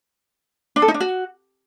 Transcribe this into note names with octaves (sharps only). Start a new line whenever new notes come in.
D4
A4
D#4
D4
F#4